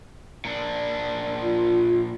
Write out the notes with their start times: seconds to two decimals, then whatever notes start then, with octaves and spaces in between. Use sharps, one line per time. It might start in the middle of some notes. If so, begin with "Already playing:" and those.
0.45 A#2 D4
1.41 F4